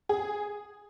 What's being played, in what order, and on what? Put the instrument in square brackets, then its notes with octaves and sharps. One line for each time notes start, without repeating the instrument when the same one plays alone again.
[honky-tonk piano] G#4